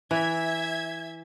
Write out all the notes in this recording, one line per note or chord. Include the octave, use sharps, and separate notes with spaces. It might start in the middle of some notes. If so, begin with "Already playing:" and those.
E3 E5 G#6